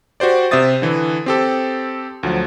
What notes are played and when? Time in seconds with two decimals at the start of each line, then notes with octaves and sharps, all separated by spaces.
0.20 F#4 G4 C5 D5
0.51 C3 C5 E5 D#6 A6
0.82 D3 E3
1.26 C4 G4 A4
2.23 D2 F3 F#3